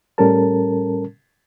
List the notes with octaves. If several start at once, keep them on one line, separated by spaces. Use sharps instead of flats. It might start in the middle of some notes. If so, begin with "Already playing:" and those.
A2 G3 C#4 A4 A#4 A5